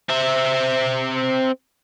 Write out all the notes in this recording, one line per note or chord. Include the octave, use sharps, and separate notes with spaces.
C4 E5